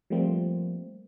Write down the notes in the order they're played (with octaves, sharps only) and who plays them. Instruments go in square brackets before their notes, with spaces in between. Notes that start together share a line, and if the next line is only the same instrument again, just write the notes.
[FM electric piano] F3 G3 A3 A#3 C4